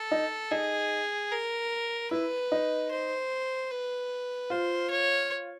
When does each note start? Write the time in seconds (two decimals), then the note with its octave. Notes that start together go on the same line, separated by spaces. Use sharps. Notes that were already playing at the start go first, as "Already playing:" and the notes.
Already playing: A4
0.11 D#4
0.51 D#4 G#4
1.31 A#4
2.11 E4 B4
2.52 D#4
2.91 C5
3.71 B4
4.50 F4 C5
4.90 C#5